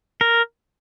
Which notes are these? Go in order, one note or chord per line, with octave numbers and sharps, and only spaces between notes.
A#4